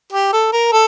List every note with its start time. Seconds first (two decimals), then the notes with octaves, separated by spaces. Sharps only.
0.13 G4
0.33 A4
0.52 A#4
0.72 A4